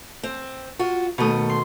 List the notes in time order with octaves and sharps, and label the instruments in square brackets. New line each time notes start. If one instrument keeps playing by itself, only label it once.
[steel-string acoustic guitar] C4
F4 F#4
[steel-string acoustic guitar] D#2 A3 [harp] B2 D#3 D#6
[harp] C6